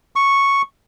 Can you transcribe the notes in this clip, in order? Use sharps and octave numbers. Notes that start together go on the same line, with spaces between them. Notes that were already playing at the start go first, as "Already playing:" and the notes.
C#6